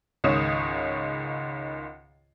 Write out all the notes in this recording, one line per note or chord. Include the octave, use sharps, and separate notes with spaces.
C#2 G#2 D#3 C#5 D#6 E7